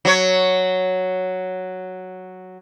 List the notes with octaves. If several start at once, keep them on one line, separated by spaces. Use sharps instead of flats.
F#3 C#5